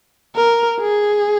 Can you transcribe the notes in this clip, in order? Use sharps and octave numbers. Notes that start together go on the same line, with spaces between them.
A#4
G#4